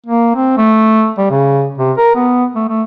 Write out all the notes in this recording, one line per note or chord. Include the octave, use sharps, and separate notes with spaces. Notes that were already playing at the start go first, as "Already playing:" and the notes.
A#3
C4
A3
G3
C#3
C3
A#4
B3
A3
A3